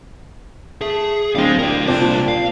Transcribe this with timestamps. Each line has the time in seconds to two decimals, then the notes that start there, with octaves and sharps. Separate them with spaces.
0.81 A3 G#4
1.35 D1 G3 G#3 C5 F5
1.59 D2 G3 A#4 D5
1.87 C2 F2 C4 D4 F4 C5
2.01 A#2
2.28 F5